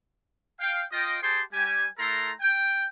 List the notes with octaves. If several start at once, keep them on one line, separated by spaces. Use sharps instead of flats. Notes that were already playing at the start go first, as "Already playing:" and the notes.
F5 G5
F4 D#5 G5
G4 G#4 C5 G5 A5 C6
G3 G4 G#5
A3 E4 A4 A#4 A#5 C6
G5